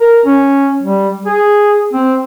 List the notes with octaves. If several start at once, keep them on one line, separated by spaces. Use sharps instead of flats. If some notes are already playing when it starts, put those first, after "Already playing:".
A#4
C#4
G3
G#4
C4